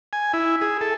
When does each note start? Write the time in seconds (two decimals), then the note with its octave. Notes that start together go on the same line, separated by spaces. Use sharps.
0.13 G#5
0.33 E4
0.61 G#4
0.81 A4